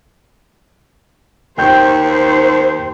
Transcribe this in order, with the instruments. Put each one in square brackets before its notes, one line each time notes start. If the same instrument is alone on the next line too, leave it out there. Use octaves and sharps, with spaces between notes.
[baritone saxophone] D#2 [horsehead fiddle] C5 [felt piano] G5 G6
[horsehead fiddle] C5